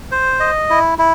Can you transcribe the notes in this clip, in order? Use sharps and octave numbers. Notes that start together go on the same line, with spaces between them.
C5
D#5
E4
E4